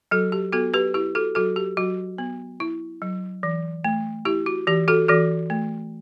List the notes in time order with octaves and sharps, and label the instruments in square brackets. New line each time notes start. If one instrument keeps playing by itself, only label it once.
[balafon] F#3 F#4 A4
G4
B3 F#4 A4
G4 B4
E4 G4
F#4 A4
F#3 F#4 A4
G4
F#3 F#4
B3
E4
F#3
E3
A3
E4 G4
F#4
E3 G4
F#4 A4
E3 F#4 A4
A3